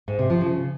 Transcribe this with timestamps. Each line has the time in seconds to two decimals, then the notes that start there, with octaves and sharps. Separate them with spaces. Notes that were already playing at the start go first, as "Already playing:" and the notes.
0.08 G#2
0.19 C3
0.30 F3
0.41 C#3